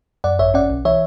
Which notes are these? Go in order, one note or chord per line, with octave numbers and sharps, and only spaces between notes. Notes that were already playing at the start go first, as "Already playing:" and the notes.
F#2 D5 F#5
G#1 C#5 E5
C#4 D5 F#5
B1
E3 C#5 E5